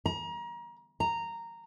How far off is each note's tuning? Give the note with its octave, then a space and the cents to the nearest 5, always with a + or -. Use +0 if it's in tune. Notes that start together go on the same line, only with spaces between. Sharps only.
A#5 +30
A#5 -10